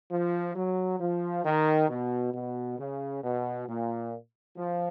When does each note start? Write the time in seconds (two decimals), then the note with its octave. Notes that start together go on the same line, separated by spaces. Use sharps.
0.11 F3
0.56 F#3
1.00 F3
1.45 D#3
1.89 B2
2.34 B2
2.79 C#3
3.23 B2
3.68 A#2
4.57 F3